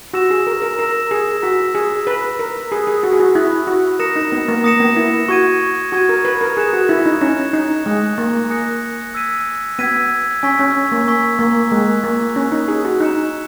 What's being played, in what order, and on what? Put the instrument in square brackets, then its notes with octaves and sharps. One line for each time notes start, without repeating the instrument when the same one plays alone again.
[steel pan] F#4 [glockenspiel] E6 A#6 E7
[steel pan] G#4
A#4
A#4
[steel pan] A#4 [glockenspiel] E6 A#6 E7
[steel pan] G#4
[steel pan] F#4 [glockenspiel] A#5 E6 B6
[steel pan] G#4
[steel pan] B4 [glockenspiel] A#5 E6 B6
[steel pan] A#4
[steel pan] G#4 [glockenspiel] B5 D#6 F#6
[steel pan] G#4
F#4
G#4
F#4
[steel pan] E4 [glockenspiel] B5 D#6 F#6
[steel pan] F#4
[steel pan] A#4 [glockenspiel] D#6 A#6 C#7 E7
[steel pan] D#4
B3
A#3
[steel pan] A#3 [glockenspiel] D#6 A#6 C#7 E7
[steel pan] B3
E4
[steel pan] F#4 [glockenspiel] C#6 G#6 D#7
[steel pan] F#4 [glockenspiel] C#6 G#6 D#7
[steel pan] A#4
B4
A#4
[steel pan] G#4 [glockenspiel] F#6 C#7 E7
[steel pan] F#4
E4
D#4
[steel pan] C#4 [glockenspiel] F#6 C#7 E7
[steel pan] D#4
[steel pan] G#3 [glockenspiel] G#5 D#6 F#6 A#6 C#7
[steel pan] A#3
[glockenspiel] G#5 D#6 F#6 A#6 C#7
E6 G#6 B6 D#7
[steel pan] B3 [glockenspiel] E6 G#6 B6 D#7
[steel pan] C#4 [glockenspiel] G#5 C#6 E6 B6
[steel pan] C#4
A#3
[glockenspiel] G#5 C#6 E6 B6
[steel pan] A#3
[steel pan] G#3 [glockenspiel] A#5 C#6 F#6
[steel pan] A#3
[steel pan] C#4 [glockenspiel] A#5 C#6 F#6
[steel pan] D#4
G#4
F#4
[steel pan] D#4 [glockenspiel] F#6 C#7 E7